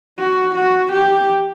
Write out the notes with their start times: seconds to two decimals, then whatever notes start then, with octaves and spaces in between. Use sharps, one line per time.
0.19 F#4
0.56 F#4
0.93 G4